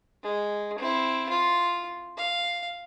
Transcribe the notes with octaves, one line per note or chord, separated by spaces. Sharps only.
G#3
C4 E4
F4
F5